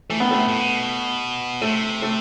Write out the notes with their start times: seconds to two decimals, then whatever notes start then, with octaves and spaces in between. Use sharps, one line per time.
0.10 E3 A3
0.20 D#3 B3
0.31 A3
0.35 C3
0.48 A2
0.60 B2
1.61 C3 A3
2.02 A3